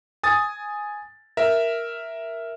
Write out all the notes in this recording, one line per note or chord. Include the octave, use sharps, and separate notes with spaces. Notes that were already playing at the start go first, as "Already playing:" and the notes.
G#5 D#6 A6
A#4 E5